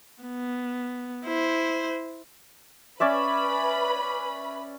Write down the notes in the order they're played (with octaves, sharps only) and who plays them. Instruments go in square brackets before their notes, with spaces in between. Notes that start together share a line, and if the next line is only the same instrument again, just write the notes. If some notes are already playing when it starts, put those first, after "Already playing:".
[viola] B3
E4 C5
[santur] C#4 D5 E5 [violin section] B4 B5